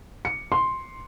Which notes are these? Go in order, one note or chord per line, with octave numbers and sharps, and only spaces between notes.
C#7
C6